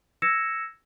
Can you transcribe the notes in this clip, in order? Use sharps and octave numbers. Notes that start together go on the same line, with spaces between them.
E6 G#6 A#6 C#7 E7